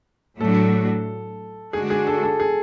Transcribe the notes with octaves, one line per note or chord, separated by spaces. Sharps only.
A2 F#3 A3 D4 F#4 A4
D3 G#3 D4 F#4 G#4
G#4
A4
A4
G#4